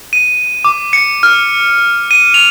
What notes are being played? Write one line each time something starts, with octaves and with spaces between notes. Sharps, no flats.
D#7
D6
C#7
F6
D#7
F7